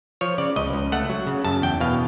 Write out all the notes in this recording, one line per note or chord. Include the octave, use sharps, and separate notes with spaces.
F3 C#5
C#3 D5
C#2 D#5
C#2
A3 F#5
F#3
C#3
F#2 A5
E2 G5
B2 F5